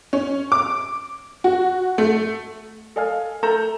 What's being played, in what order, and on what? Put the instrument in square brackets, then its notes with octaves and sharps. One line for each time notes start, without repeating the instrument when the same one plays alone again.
[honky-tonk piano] C#4
D6
F#4
A3
[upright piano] A4 D#5 F5 G#5 F6
A3 A4 A#5 G6 E7